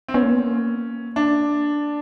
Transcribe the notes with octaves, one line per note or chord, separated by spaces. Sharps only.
C4
B3 C#4
A#3
B3
A#3
D4